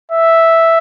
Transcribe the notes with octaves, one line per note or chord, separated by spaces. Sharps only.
E5